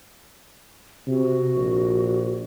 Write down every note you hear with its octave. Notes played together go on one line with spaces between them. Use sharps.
C3 F#4
A#1